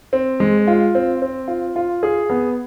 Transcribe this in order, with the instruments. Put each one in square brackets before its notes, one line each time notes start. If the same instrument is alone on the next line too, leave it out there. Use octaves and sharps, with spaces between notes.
[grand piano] C4
G#3
F4
C4
C4
F4
F4
G#4
B3